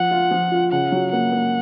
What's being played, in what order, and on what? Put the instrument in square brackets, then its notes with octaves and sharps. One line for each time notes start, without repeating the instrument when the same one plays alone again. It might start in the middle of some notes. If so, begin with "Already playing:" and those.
Already playing: [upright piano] F3 [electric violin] F#5
[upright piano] F4
F3
F4
[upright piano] C#3 [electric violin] F#5
[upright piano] F#3
[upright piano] A#3 [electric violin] F#5
[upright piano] A#3